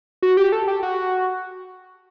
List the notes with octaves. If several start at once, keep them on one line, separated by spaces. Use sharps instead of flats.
F#4
G4
A4
G4
F#4